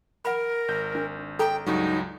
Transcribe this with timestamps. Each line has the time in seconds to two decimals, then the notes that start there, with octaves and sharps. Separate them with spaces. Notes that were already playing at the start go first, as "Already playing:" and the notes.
0.25 A#4 F#5 B5
0.68 G#1 G6
0.95 D4
1.39 A4 G5 A#5
1.66 C#2 G2 F#3 D#4